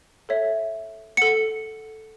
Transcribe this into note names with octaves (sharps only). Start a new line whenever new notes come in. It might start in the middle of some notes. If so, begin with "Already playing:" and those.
A4 C#5 E5
A4 F#5 C#7